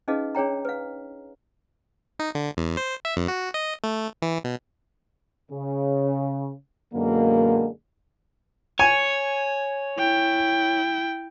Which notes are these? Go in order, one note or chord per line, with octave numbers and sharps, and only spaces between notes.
C#4 D#4 G#4 B4 D#5 F5
D4 G#4 C#5 G5 A#5
B4 F5
D#4
D3
E2
C5
E5
F2
F#4
D#5
A3
E3
B2
C#3
F#2 B2 D3 G#3 A#3
C#5 G#5
E4 G5